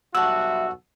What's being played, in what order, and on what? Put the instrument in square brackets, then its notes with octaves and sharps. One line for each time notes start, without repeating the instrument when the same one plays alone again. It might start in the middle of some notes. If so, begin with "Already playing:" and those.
[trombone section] B1 G3 F#4 [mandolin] E4 E5 [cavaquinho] F#5 A5 [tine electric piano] E6